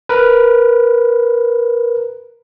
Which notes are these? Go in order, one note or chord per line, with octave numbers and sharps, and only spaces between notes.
A#4 B4